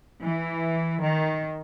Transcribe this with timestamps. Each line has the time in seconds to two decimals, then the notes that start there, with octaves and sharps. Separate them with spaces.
0.21 E3
1.03 D#3